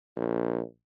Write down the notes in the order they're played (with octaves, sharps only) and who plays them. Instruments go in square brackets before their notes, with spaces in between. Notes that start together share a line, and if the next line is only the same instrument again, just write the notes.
[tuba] A#1